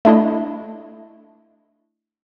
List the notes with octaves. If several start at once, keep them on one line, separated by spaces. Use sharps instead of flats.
A3 D4 E4 D#5